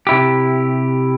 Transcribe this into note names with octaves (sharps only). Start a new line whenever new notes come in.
C3 E4 G4